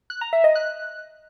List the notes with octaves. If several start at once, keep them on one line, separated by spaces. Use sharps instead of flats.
F#6
A#5
E5
D#5
F#6